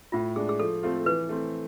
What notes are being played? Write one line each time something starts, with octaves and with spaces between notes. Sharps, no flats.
A2 F4
G#3 D4 G#4
G#4
F3 A4
A3 C4 F4
E3 B4
A3 C4